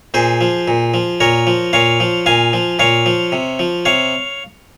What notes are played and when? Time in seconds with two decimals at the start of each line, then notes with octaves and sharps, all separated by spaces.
0.14 A#2 G#4 C5
0.41 F3
0.68 A#2
0.94 F3
1.20 A#2 A#4 C#5
1.47 F3
1.73 A#2 C#5 F5
2.00 F3
2.26 A#2 F5 G#5
2.53 F3
2.79 A#2 C#5 F5
3.06 F3
3.32 C3
3.59 F3
3.85 C3 C#5 F5